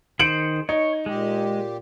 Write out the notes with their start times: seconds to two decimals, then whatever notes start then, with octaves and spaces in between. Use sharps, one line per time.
0.19 D#3 G#4 C5 C#7 D7 F#7
0.69 D#4 C#5
1.06 A#2 G#3 G4